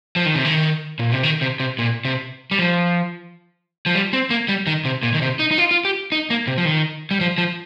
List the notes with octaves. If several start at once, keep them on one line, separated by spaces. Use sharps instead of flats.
F3
D#3
C3
D#3
A#2
C3
D#3
C3
C3
A#2
C3
G3
F3
F3
G3
C4
A#3
G3
D#3
C3
A#2
D#3
C3
D#4
D#4
F4
F4
G4
D#4
A#3
C3
F3
D#3
G3
F3
F3